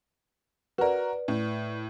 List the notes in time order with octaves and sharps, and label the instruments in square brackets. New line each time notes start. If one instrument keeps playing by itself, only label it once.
[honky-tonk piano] F#4 A#4 [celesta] B4 D5
[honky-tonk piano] A2